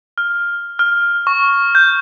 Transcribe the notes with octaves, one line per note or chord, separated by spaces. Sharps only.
F6
F6
C#6
G6